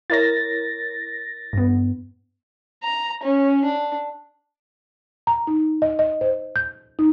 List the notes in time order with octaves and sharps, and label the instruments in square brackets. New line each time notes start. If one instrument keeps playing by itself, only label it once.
[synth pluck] E4 A#4 C#5 [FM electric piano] A6 A#6
[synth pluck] G2 B3
[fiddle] A#5
C#4
D4
[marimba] A#5
D#4
D#5
D#5
C5
G6
D#4